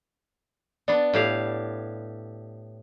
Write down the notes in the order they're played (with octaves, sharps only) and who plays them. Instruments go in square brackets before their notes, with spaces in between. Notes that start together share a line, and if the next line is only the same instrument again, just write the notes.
[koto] B3 D4 [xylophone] D5
[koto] A2 G4 F5